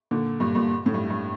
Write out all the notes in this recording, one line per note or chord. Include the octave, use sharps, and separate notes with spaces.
A#2 D3
G2 A#2
G2 A#2
A2
G2
G2